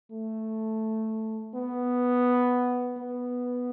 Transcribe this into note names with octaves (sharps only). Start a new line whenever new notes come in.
A3
B3
B3